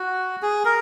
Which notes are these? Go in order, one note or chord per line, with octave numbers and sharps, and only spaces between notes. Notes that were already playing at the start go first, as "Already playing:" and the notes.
Already playing: F#4
G#4
A#4